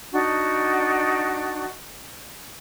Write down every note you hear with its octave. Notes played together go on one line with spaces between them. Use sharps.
D4 D#4 F#4